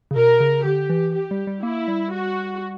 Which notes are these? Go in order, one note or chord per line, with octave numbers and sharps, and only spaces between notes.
C#3
B2 A#4
C#3
D3 G4
E3
G4
G3
G3
A#3 E4
G3
F#4